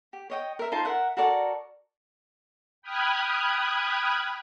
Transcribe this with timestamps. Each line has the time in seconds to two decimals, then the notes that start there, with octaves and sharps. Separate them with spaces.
0.13 G4
0.30 C#5 D#5 G5
0.59 A#4 E5
0.72 D#4 F4 C5 A5
0.85 A#4 E5 F#5
1.17 F#4 A4 A#4 D5
2.82 G5 B5 D#6 F6 F#6 G#6